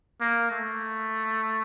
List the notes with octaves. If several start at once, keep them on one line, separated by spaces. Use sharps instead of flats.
A#3
A3